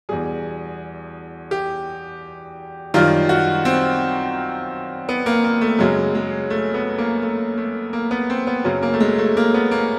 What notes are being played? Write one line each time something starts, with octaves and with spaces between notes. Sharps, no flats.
E2 B2 G3 G#4
G4
F#2 D#3 G3 F4
F#4
C4
B3
A#3
A#3
A3
F#2 C#3 F#3 G#3
G#3
A3
B3
A#3
A3
A3
A#3
B3
C4
B3
F#2 C#3 F#3
A#3
A3
G#3
A3
A#3
B3
A#3